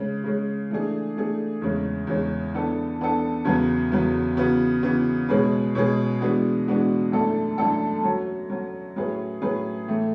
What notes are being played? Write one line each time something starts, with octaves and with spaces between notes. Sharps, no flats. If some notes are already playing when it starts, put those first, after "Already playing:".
Already playing: C#3 G#3 C#4
C#3 G#3 C#4
E3 A3 D4 G#4
E3 A3 D4 G#4
E2 C#3 G#3 C#4
E2 C#3 G#3 C#4
E3 B3 D4 A4
E3 B3 D4 A4
E2 C#3 F#3 B3
E2 C#3 F#3 B3
C#3 E3 B3 F#4
C#3 E3 B3 F#4
B2 G#3 C#4 G#4 B4
B2 G#3 C#4 G#4 B4
E3 G#3 B3 D4 F#4
E3 G#3 B3 D4 F#4
F#2 E3 A3 D4 A4
F#2 E3 A3 D4 A4
F#3 C#4 F#4
F#3 C#4 F#4
A2 F#3 C#4 G#4 B4
A2 F#3 C#4 G#4 B4
A2 E3 A3